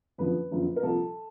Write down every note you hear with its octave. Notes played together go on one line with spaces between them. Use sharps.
F#1 F2 D3 F3 B4
F#1 F2 D3 F3
A#4
C2 A#2 F3 A4